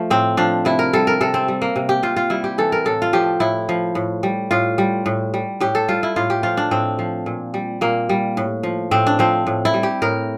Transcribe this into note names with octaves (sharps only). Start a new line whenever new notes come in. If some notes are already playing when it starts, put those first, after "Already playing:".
Already playing: F3 A3
A2 C4
F3 D4
C3 E4
A#4
G3 A4
A#4
C3 A4
C4
G3
A#3
C3
G4
C3 F4
F4
G3 E4
G4
E3 A4
A#4
A2 A4
F4
F3 G4
A2 E4
F3
A2
G3
A2 F4
G3
A2
G3
A2 G4
A4
G3 F4
E4
A2 F4
G4
F3 F4
D4
A2 C4
F3
A#2
G3
A#2 A#3
G3
A2
F3
A2 C4
D4
F3 C4
A2
E4
G3
G4
A2 A#4